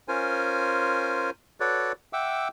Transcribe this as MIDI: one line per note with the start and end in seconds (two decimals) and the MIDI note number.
0.08 1.30 61
0.08 1.30 65
0.08 1.30 70
0.08 1.30 72
0.08 1.30 80
1.60 1.92 66
1.60 1.92 69
1.60 1.92 71
1.60 1.92 73
1.60 1.92 74
2.13 2.48 76
2.13 2.48 78
2.13 2.48 79
2.13 2.48 86
2.13 2.48 88